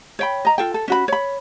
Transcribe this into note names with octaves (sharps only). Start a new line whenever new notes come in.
C#5 G5 B5
D#5 A#5
F4 A4 G5
A4
C#4 F#4 B5
C#5 B5